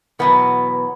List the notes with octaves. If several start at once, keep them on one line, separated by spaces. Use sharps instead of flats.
E2 B2 F#3 B3